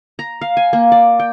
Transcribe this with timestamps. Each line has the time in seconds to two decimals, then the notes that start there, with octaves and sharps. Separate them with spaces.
0.19 A#5
0.41 F5
0.57 G#5
0.73 A#3
0.92 D5
1.20 G5